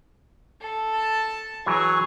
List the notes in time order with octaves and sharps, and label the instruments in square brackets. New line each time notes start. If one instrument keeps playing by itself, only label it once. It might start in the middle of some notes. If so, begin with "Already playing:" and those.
[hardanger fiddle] A4
[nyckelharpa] A5
[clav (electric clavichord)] E3 F#3 [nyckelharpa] G#4 C#5